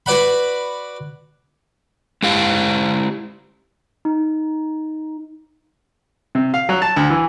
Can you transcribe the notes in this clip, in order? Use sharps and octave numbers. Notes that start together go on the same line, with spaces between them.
F#4 B4 D5 F#5 B5
G#3 E4 G4 F5
D#4
C3
F5
F#3
A5
D2
E3